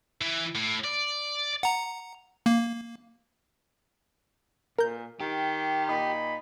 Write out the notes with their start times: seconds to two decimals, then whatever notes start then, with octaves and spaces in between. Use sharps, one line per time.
0.21 E3
0.56 A2
0.85 D5
1.63 F#5 A#5
2.46 A#3
4.79 A#2 A#4 G6
5.20 D#3 G4
5.88 A#2 D#4 B5